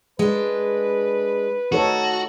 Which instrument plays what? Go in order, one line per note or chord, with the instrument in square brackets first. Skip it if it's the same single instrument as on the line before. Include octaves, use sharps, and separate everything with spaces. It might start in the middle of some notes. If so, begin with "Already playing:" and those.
[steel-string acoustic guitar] G#3 D4 [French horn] B4
[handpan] D#4 A4 C#5 [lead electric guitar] F#4